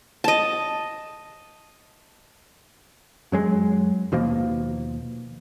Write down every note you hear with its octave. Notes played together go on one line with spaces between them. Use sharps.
D#5 A5
F#2 F#3 G#3
D#2 B2 F3 A#3